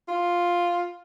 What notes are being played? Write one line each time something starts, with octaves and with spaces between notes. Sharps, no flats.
F4